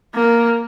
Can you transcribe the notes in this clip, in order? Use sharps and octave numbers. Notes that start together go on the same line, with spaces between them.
A#3